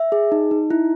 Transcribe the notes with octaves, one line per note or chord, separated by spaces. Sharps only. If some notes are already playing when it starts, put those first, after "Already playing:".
Already playing: E5
G#4
D#4
D#4
E4